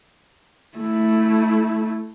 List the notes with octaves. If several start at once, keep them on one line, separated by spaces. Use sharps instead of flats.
A3 E4